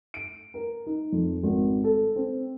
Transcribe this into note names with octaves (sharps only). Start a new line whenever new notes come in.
D7
A#4
D#4
F2
G#1
A4
C4